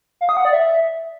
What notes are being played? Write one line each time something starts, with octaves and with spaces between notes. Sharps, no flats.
F5
D#6
F#5
D5
E5